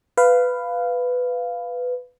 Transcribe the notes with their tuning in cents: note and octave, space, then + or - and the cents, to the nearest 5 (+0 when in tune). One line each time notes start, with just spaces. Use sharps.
B4 +10 F5 -5